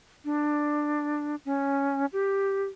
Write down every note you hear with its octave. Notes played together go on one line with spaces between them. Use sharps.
D4
C#4
G4